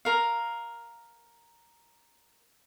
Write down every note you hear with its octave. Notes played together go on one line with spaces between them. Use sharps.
A#4 F5